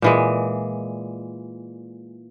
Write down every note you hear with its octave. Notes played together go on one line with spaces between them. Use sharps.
A#2 E3 G#3